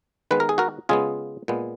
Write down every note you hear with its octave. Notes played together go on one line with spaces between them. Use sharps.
D#3 G#3 B3 B4
A#4
G#4
F#4 A#4
C#3 G#3 B3 F4 G#4
A#2 G#3 B3